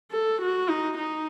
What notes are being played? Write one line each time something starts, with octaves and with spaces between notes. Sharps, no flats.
A4
F#4
D#4
D#4